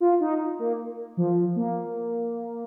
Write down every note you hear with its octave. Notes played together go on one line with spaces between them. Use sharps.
F4
D#4
A#3
F3
A#3